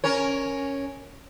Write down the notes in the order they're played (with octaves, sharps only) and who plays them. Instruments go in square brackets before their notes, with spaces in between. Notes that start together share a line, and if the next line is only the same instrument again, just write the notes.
[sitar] C#4 A#4 C#5